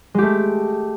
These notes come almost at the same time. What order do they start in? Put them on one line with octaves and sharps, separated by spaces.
G#3 G4 A3